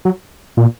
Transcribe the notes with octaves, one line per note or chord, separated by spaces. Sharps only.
F#3
A#2